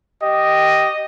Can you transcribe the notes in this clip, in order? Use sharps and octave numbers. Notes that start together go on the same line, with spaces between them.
G4 D#5